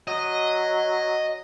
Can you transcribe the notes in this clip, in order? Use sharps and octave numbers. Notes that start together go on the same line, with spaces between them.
F#3 D#5